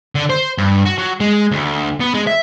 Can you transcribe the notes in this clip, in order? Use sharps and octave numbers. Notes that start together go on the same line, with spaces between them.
D3
C5
G2
F#4
F#3
G#3
D2
B3
G#3
E5